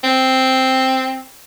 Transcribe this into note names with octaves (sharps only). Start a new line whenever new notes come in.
C4